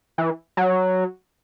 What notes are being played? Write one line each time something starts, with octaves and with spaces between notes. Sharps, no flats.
E3
F#3